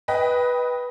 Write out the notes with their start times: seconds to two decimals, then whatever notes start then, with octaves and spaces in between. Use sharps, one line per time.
0.08 B4 D#5 G5 F#6 B6